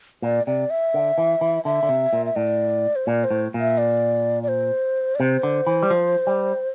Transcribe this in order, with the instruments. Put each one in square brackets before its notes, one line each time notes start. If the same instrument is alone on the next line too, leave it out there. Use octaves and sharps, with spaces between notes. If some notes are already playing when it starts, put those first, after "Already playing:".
[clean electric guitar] A#2 [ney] D5
[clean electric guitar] C3 [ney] D5
[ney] E5
[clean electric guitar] D3
E3
E3
[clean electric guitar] D3 [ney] E5
[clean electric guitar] D3
C3
A#2
[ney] E5
[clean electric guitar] A2 [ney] D5
[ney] C5
[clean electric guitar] A#2 [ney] D5
[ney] C5
[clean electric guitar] A2
A#2
[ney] E5
D5
D5
C5
D5
[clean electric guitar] C3 [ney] C5
[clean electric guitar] D3
E3
G3
F3
G3